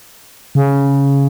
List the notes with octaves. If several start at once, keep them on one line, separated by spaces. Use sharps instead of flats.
C#3